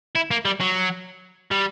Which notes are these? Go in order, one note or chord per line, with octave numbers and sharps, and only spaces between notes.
E4
A#3
G3
F#3
G3